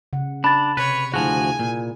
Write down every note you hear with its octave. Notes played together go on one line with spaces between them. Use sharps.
C#3 F#5
D4 B5 A6
C3 B4 C#5
D2 F3 E4 F#4 G#4 G#5
A#2